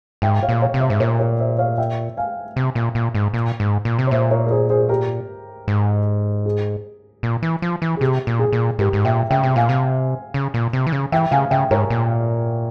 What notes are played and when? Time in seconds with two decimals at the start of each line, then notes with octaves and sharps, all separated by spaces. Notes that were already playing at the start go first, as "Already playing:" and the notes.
0.22 G#2 E5 G5
0.43 C#5 F5
0.49 A#2
0.61 C#5 F5
0.74 C3
0.80 C5 E5
0.90 G#2
1.00 A#2 A#4 C#5
1.19 A#4 C#5
1.39 C5 E5
1.58 C#5 F5
1.78 E5 G5
2.17 F5 G#5
2.56 C3
2.75 A#2
2.95 A#2
3.15 G#2
3.34 A#2
3.60 G#2
3.85 A#2
3.99 C3
4.07 C#5
4.11 A#2 C5 E5
4.31 A#4 C#5
4.46 A#4
4.51 G#4 C5
4.70 G#4 C5
4.89 G4 A#4
5.68 G#2
6.46 G#4
7.23 A#2
7.43 E3
7.62 F3
7.82 E3
7.97 G#4
8.01 C3 G4
8.27 A#2
8.39 G#4
8.53 A#2
8.79 G#2 G4 A#4
8.93 G#2
9.04 A#2 E5 G5
9.30 C#3 E5 G5
9.43 C3
9.56 A#2 F5 G#5
9.69 C3
10.34 C#3
10.54 A#2
10.73 C3
10.87 E3
10.92 C#3
11.12 E3 E5 G5
11.31 C#3 F5 G#5
11.51 C#3 E5 G5
11.71 G#2 A#4 C#5
11.90 A#2